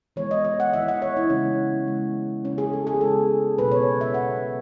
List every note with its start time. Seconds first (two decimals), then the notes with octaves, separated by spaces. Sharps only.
0.16 E3 G#3 B3 C#5
0.31 D#5
0.45 D#5
0.60 F#5
0.73 E3 G#3 B3 E5
0.88 F#5
1.02 C#5
1.17 E4
1.30 C#3 G#3 B3 C#4
1.87 C#3 G#3 B3
2.44 C#3 G#3 B3 C#4
2.58 G#4
2.73 A4
2.87 G#4
3.01 C#3 G#3 B3 A4
3.58 B2 F#3 B3 B4
3.72 C#5
4.01 E5
4.14 B2 F#3 B3 F#5